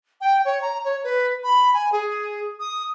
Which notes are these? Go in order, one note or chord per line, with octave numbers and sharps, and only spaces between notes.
G5
C#5
A#5
C#5
B4
B5
G#5
G#4
D#6